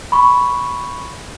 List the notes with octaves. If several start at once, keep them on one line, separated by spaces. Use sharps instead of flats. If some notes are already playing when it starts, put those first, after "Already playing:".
B5 C#6